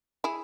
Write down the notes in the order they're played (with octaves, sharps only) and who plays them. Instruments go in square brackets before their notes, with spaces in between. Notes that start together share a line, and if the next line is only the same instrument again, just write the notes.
[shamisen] E4 G#4